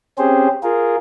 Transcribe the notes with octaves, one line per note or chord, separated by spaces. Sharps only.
C4 C#4 G4 G#4 C5
F4 G#4 A#4